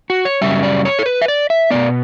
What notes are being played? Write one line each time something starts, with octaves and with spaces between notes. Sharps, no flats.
F#4
C#5
F#2 C#3 G3 E5
D5
C#5
A4
B4
E5
D5
E5
B2 G3 B3 D5